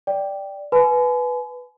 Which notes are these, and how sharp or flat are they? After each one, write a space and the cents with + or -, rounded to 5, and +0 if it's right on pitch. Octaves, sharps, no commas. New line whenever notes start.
D5 +0 G5 +0
B4 +0 G#5 +40 B5 +40